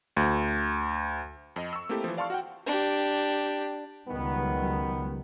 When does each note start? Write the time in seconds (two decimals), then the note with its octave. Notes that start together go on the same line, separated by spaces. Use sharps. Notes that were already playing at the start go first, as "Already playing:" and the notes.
0.17 D2
1.56 F2 D#5
1.73 C#6 E6
1.89 A3 A#3 C4 E4 G4 A4
2.04 E3 F3
2.17 D5 F5 A5 C6 C#6 F6
2.30 F#4 F#5 G5
2.67 D4 G4
4.08 C#2 D#3 F#3 G3 B3